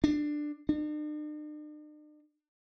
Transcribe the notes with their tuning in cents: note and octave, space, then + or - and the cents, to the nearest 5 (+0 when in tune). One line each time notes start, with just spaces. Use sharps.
D4 +15
D4 +45